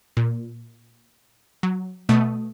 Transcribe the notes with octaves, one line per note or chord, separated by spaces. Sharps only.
A#2
F#3
B2 A3 D#6